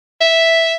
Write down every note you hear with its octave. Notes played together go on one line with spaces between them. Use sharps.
E5